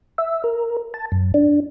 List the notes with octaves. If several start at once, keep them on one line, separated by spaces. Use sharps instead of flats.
E5
A#4
A5
F#2
D4